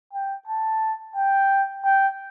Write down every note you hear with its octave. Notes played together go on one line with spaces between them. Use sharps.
G5
A5
G5
G5